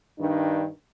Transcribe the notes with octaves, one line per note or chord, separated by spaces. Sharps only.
G2 D#3 D4